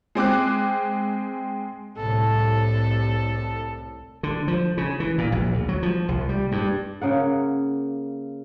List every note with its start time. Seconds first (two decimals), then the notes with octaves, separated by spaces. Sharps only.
0.15 G#3 C4 D6 F#6
1.98 C2 A2 A4
4.23 D3
4.48 F3
4.77 C#3
5.00 E3
5.18 A#2
5.32 A#1
5.52 D2
5.69 F#3
5.83 F3
6.08 C2
6.29 G3
6.52 G2
7.02 C#3 A#3 F#5